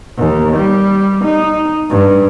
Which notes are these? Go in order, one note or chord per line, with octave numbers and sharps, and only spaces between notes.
D#2
G3
D#4
G2